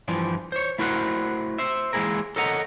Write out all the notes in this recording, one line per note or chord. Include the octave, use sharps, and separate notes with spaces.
G2 E3 F3
C5 C#5
A3 E4 F#4 A#4 C5 F#5
C5 E5
E3 G#3 A#3 E4 G#4 A#4
A4 A#4 C#5 D#5 F#5 A#5